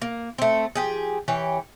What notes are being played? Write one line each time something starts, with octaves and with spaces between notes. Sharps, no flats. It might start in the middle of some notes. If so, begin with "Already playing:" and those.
A#3
A3 C4
F3 G4 G#4
E3 G4 C#5